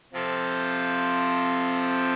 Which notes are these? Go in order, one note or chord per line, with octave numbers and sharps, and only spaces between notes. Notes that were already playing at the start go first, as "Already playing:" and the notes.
C3 F3 C4 F4 A4